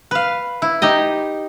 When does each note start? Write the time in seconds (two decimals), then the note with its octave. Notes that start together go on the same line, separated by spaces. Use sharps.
0.11 B4 F5
0.62 E4
0.82 D#4 G4 D#5